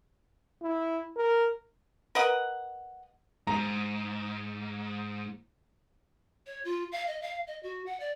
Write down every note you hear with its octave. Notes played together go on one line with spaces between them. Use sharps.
E4
A#4
A#4 B4 D#5 F#5
G#2 A#5
C#5
F4
F5
D#5
F5
D#5
F#4
F#5
D5